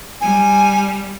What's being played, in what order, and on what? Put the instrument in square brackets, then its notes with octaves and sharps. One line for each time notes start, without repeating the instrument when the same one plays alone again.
[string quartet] G3 [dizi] G#5